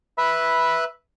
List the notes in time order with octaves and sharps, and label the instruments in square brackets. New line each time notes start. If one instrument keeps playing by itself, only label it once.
[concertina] B4 E5 B5